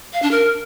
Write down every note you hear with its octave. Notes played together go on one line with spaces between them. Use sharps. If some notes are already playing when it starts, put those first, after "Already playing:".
F5
D4
A#4